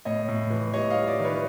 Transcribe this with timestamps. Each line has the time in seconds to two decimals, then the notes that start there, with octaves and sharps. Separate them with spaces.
0.05 A2 C#5 D#5
0.28 A2
0.50 E3
0.73 G3 C#5 D#5
0.90 D#5 F5
0.96 G3
1.07 D5 E5
1.19 D#3
1.24 B4 C#5